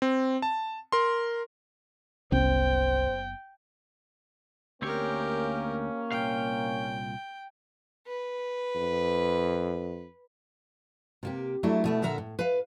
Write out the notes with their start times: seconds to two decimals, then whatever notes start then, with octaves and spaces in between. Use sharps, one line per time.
0.02 C4
0.42 A5
0.92 A#4 C6
2.32 F#1 C2 B3 C#4 C5 G5
4.82 D2 A#3 C4 C#4 G4 A#4 C#5
6.12 C2 A#2 F5 G5
8.07 B4
8.75 F2
11.23 C3 A#3 G4
11.63 F#3 A3 D4 E4
11.84 B2 A3 E4
12.02 A#2 D3 A#4 E5 F#5 A#5
12.18 A2
12.39 B4 F5